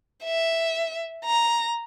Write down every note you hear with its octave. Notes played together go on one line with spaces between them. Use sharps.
E5
A#5